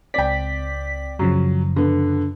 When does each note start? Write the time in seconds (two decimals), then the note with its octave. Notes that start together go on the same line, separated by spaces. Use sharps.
0.14 C#2 C4 D5 G5 B6
1.19 F#2 C#3 F3 F#3
1.76 D3 B3